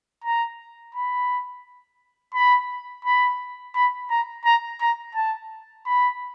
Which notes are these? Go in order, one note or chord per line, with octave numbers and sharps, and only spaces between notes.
A#5
B5
B5
B5
B5
A#5
A#5
A#5
A5
B5